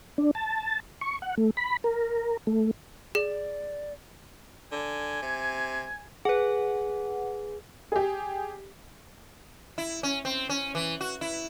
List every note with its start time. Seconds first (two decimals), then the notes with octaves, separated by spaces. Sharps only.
0.18 D4
0.35 A5
1.01 C#6
1.22 F#5
1.38 A3
1.57 B5
1.84 A#4
2.47 A3
3.15 G#4 D5
4.72 D3 G#5
5.22 C3
6.25 G#4 B4 F#5
7.92 G4 G#4
9.78 E4
10.03 C#4
10.25 C4
10.49 C#4
10.75 E3
11.01 F#4
11.21 E4